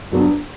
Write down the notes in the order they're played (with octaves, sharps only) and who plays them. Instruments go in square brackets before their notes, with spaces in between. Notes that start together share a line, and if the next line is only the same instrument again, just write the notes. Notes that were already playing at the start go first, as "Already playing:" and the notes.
[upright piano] G2 F#3 B3 D4